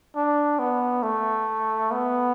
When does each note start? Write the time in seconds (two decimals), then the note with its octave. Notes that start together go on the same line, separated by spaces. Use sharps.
0.15 D4
0.59 B3
1.03 A3
1.91 B3